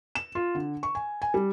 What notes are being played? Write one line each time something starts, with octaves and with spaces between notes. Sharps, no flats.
E7
F4
D3
C#6
G#5
G#5
G3